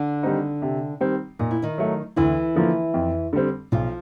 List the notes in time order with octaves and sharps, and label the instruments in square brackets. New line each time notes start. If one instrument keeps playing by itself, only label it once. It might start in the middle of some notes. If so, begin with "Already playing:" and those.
Already playing: [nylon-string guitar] D3 D4
[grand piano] D#3 G3 C4 D#4
C3
D#3 G3 C4
[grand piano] A#2 [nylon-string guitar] D#4
[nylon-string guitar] E4
D#3 D#4
[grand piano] F#3 A3
[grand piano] D2 [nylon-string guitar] E3 E4
[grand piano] D3 F3 A#3
F2
D3 G3 C4
[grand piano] B1 [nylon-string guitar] F3 F4